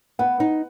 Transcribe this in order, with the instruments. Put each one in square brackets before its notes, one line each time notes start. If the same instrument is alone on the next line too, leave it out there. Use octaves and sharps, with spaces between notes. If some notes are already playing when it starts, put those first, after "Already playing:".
[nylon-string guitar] B3 [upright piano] F#5
[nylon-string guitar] D#4